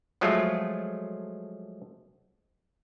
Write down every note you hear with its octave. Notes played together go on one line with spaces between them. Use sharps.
F3 F#3 G#3 A3 F4